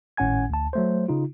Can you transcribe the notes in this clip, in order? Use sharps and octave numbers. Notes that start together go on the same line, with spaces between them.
G#1 A2 C#4 F#5 G#5 G#6
D2 A5
F#3 A3 C5
C#3 D#4 F4